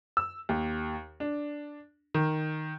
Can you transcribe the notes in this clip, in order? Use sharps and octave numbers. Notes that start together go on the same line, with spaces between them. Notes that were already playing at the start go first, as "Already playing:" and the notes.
E6
D#2
D4
D#3